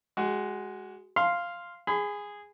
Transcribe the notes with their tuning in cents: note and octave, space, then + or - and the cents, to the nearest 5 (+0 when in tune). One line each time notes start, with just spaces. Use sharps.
G#3 +0 F#4 +20
F5 -5 C6 +0
G#4 -10 B5 +35